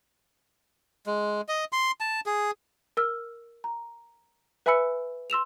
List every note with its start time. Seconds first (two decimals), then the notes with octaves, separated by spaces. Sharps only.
1.06 G#3
1.48 D#5
1.72 C6
2.00 A5
2.26 G#4
2.97 A#4 E6 F6
3.64 A#5
4.66 B4 E5 G#5 B5 E6 C#7
5.30 C6 E6 E7 F7